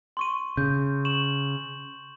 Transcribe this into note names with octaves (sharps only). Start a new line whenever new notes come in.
C6 C#6 D#7
C#3 G6
C#6 E7 F#7